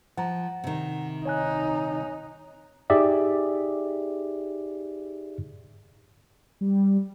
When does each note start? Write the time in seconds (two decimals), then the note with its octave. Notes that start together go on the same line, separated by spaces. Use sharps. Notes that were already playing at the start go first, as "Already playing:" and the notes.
0.17 F3 F#5 A#5
0.64 C3 D#3
1.25 D#4 C#5 G#5 F#6
2.90 D#4 G4 G#4 D5 E5
6.61 G3